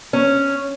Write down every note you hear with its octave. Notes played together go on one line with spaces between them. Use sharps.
C#4